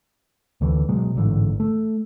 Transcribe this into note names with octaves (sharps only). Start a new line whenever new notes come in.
D2 D3 E3
B2 F#3 G#3
A1 G#2 D3 E3
A3